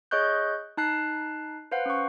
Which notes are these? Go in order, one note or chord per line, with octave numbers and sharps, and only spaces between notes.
G#4 C#5 D#5 C#6 F#6 G6
D#4 A5 F#6 C7
B4 C5 F5 F#5
C#4 C#6